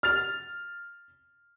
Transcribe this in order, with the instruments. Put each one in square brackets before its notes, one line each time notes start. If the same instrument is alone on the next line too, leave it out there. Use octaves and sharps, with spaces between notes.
[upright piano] F6 A6 F7